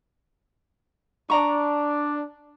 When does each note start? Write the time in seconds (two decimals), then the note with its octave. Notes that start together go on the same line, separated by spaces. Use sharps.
1.30 D4 D5 A#5 C#6